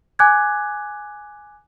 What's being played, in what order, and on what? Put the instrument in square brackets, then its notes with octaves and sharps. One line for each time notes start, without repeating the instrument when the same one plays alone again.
[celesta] G#5 D6 F#6 G#6